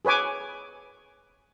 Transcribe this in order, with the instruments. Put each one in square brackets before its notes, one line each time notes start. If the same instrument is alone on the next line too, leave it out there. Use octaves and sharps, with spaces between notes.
[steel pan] G#4 B4 C#5 G#5 D6